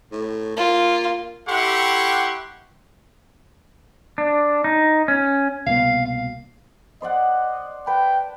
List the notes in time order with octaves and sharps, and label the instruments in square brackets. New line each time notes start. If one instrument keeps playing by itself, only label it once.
[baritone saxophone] A2
[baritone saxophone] A#3 [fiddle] F4
[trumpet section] E4 G4 A4 F#5 C6 C#6
[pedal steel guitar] D4
D#4
C#4
[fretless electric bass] C2 B2 A#3 [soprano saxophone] F5
[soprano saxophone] F5
[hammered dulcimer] C5 D5 F#5 [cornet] D#5
[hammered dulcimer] B4 A5 [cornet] G5